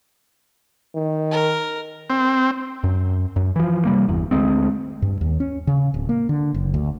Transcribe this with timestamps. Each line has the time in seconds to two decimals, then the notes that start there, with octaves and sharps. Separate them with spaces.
0.95 D#3
1.31 A#4
2.10 C4
2.84 F#2
3.36 F#2
3.56 E3 F3
3.85 C3 G3 A#3
4.08 G1 E2
4.31 D2 G#3 C4
5.02 G2
5.21 D#2
5.40 C#4
5.67 C#3
5.94 D1
6.09 A#3
6.29 D3
6.54 F#1
6.74 D2